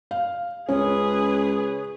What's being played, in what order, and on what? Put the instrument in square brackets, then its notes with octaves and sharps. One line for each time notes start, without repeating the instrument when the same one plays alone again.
[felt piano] F5
[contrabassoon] C#2 [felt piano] C#4 [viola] G#4 B4